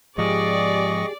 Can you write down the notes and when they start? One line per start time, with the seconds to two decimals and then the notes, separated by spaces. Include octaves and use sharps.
0.18 G#2 F3 G4 G#4 D5 D#5 C#6